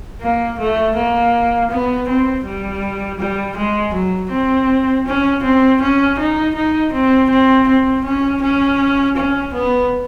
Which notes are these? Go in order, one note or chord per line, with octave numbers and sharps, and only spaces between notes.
A#3
A3
A#3
B3
C4
G3
G3
G#3
F#3
C4
C#4
C4
C#4
D#4
D#4
C4
C4
C4
C#4
C#4
C#4
B3